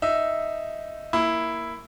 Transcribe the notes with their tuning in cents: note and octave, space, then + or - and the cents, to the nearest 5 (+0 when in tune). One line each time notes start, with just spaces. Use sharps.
D#4 +0 E5 +0
A#3 +0 E4 +0